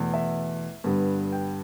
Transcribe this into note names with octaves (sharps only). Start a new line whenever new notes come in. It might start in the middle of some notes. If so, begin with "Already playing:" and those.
Already playing: E2 B2 A3
E5
G2 D3 G3 B3
G5